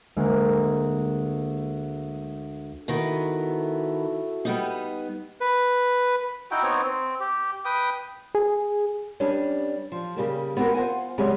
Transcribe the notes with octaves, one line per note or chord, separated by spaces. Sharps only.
D2 G#3 A#3
D#3 B3 E4 F#4 A4
G3 B3 D#4
B4
D#4 E4 F#4 G5
B3 C4 D#4 C#5
C4
G4
B4 G5 D#6
G#4
G3 C#4 D4 B4
F3
C#3 G3 A#3
B3 C4 F#4 A4 A#4
F4 C5 F#5 G#5
F#2 C#3 G3 G#3 C4 C#4